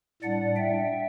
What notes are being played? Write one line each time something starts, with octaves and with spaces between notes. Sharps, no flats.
A2 G3 D4 D5 F#5
E5 G5